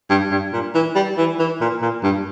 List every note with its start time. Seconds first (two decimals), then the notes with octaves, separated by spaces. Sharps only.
0.10 G2
0.31 G2
0.53 A#2
0.75 E3
0.96 G3
1.18 E3
1.39 E3
1.61 A#2
1.82 A#2
2.03 G2